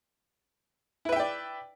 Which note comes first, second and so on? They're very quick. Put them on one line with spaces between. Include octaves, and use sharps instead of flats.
E4 B4 E5 G5 D5